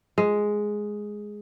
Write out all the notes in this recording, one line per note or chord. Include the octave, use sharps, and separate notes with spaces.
G#3